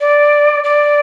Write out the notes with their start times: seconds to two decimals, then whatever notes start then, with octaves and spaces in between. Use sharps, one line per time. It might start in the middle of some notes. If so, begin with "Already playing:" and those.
0.01 D5
0.64 D5